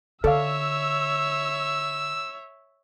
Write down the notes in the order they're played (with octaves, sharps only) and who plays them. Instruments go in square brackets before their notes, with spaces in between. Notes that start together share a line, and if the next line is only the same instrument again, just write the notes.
[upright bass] D3 [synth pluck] A4 D5 F5 [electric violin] C#5 E5 [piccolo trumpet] E6